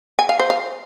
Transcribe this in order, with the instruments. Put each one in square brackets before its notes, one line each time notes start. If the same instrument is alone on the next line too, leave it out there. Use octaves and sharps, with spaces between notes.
[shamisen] G#5
F5
C5
F5